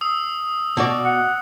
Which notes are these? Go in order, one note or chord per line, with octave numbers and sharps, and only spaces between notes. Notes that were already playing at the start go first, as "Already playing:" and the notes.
D#6 E6
B2 F#4 D5
F#5